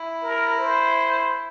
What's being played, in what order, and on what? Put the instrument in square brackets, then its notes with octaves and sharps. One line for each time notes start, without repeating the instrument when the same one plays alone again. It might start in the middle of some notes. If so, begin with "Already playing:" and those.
Already playing: [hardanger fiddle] E4
[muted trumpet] A#4
C5